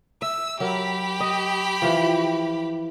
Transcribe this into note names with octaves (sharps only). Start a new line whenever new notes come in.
E5 E6
F#3 G4 A#4 B5
D#5
E3 F3